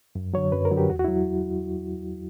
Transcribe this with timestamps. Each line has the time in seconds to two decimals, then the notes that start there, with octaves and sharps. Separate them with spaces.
0.15 F#2
0.34 D3 F#3 C#5
0.52 F#2 B4
0.65 A#4
0.71 D3 F#3
0.77 G4
0.89 E2 F#4
0.99 F#4
1.04 E4
1.08 F#3